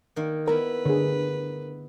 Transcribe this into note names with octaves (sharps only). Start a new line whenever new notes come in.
D#3 A#3
B3 E4 A#4 B4
D3 G#4